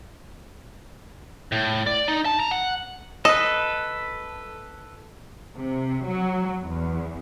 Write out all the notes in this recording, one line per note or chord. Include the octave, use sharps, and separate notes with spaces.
A2
D5
D#4
A5
A#5
F#5
A4 B4 D#5
C3
F#3
E2